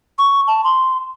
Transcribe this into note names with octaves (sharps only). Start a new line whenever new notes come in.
C#6
A5
C6